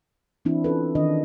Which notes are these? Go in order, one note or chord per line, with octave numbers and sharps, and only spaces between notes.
E3 C4 D4 E4
C#4 F4 A4 B4
D#3 D4 D#5